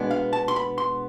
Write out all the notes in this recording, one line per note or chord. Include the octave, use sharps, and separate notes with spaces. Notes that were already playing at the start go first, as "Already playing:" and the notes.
Already playing: B2 G#3 B3 D4
F5
A5
C6
B5
C6